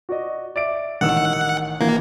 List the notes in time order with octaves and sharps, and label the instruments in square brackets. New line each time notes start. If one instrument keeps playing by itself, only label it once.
[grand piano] F#4 D5 D#5
D5 E5 D7
[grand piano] A1 D#3 E6 [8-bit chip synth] F#5
[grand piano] G#1 E3 G#6 [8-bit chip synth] A#3